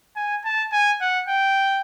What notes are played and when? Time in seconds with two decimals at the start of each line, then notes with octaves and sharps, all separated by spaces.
0.16 G#5
0.45 A5
0.72 G#5
1.01 F#5
1.29 G5